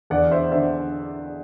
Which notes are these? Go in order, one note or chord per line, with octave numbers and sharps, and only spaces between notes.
E2 D3 D5 F#5
C5 E5
D3 C5 E5